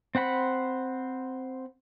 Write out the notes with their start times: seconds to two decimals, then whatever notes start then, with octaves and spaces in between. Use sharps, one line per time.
0.15 C4 C5 F#5 B5